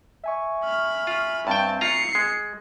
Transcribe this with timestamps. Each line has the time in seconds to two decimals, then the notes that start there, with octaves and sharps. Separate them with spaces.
0.24 E5 G#5 C#6
0.64 B5 F6
1.07 F4
1.47 G2 C4 G5 A5
1.81 F4 A#5 C7 C#7
2.15 G#3